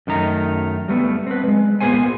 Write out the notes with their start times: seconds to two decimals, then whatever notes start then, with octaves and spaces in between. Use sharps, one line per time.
0.07 F#2 D#3 A3 A#5
0.88 G3 A3 B3
1.27 C4 B4
1.44 G3 G#3
1.80 A#2 F#3 B3 G#4 C5 G#5